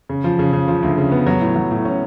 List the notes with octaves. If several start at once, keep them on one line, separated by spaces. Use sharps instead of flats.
C#3
F3
C#3
C#3
F3
D2
C#3
B3
F#3
A2
F#3
A2
C#4